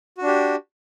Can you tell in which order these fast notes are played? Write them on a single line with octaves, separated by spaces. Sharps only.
F#4 D4 G4